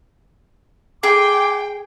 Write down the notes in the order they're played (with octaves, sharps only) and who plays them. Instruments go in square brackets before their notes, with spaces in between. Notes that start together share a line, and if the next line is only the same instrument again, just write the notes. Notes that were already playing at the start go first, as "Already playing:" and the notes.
[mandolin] G#4 [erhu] G5 [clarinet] D6